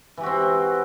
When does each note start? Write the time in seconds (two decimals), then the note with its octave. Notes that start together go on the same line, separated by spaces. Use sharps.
0.17 E3
0.20 G4
0.23 F#4
0.26 C4